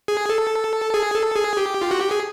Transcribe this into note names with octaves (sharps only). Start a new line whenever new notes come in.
G#4
A4
G#4
A4
G#4
G4
F4
F#4
G4
G#4